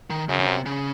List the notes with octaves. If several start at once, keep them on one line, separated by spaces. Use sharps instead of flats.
D#3
F#2 C#3
C#3
C3
C#3